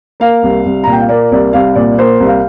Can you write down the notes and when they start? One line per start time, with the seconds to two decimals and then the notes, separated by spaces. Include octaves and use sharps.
0.20 A#3 F5
0.43 C2
0.65 C2
0.84 A#2 A#5
0.92 G5
1.00 F5
1.09 A#3 D5
1.31 C2 D5
1.53 C2 F5
1.76 A#2 D5
1.98 A#3 C5
2.20 C2
2.27 F5